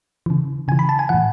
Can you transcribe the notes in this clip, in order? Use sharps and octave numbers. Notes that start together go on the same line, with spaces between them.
C#3 E3
C#3 E3 G#5
B5
A5
G#5
A2 E3 F#5